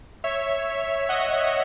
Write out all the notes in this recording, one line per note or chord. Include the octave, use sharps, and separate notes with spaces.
C#5 E5
D#5 F#5